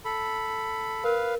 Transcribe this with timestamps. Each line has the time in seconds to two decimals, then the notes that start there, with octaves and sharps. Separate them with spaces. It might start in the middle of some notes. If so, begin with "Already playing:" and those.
0.05 A4 B5
1.04 A#4 B4 F5